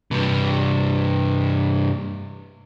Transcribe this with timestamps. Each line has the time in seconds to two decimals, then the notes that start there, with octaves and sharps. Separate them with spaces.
0.11 G2 C3